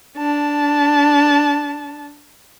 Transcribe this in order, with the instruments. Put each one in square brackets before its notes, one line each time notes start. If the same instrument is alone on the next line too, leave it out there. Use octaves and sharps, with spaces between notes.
[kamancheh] D4 A5